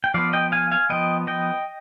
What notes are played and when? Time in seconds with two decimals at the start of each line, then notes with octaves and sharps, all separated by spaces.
0.04 G5
0.14 F3 B3 D5 F5
0.33 D#5 G5
0.52 F5 G#5
0.71 F5 G#5
0.90 F3 B3 D#5 G5
1.27 D#5 G5